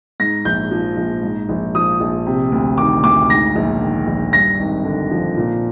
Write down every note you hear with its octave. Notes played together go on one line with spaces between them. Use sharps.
G#2 A#6
A#1 G6
F3
A#1
G#2
A#1
F3 D#6
A#1
C3
D2
D#3 D6
D2 D6
G#2 A#6
A#1
D#3
A#1
G2 A#6
G#1
D3
F3
A#2